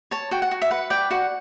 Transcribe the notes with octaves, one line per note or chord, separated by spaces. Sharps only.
C#5 A5
F#4 G5
F#5
F#4
E5
B4 F#5
D5 G5
F#4 F#5